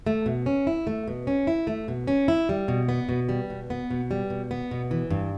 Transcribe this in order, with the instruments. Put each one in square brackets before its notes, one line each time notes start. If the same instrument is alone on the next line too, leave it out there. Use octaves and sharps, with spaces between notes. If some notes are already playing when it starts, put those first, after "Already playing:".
[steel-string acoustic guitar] A3
B2
C#4
E4
A3
B2
C#4
E4
A3
B2
C#4
E4
G3
B2
B3
B2
G3
B2
B3
B2
G3
B2
B3
B2
E3
G2